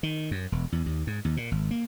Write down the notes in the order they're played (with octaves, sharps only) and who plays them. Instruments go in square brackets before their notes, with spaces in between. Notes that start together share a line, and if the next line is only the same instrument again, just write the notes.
[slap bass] D#3
F#2
E1
E2
D#2
G#2
D#2
A#2
G#1
A#3